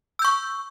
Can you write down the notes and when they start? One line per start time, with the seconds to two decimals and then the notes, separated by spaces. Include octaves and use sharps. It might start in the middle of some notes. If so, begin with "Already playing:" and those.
0.19 E6
0.22 G6
0.24 C#6